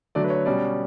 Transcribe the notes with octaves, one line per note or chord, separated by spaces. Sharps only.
D3 F#3 A3 D5
B4
C#5
B2 G3 C#4 D5